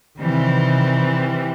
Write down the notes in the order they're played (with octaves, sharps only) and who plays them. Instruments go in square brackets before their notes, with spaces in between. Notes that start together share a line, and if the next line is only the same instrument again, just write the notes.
[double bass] C3 D#3 [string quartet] E3 G3 C4